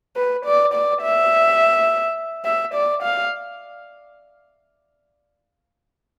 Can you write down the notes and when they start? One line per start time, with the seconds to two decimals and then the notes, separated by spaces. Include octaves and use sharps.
0.16 B4
0.46 D5
0.74 D5
1.03 E5
2.45 E5
2.74 D5
3.03 F5